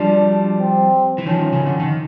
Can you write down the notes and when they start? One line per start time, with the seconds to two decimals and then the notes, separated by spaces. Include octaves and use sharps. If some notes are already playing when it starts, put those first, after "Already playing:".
Already playing: F3 G3 D4
0.59 C4
1.18 E3
1.26 D#3 F3 C#4
1.53 C#3
1.66 D3
1.80 D#3